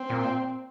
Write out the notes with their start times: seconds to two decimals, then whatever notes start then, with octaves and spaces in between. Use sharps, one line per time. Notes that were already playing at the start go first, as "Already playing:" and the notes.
Already playing: C4
0.10 A#2